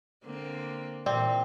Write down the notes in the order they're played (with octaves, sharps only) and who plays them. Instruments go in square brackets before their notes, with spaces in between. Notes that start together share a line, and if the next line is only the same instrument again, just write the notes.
[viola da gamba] D3 A#3 C4
[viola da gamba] A#2 E3 [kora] C4 [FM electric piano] D5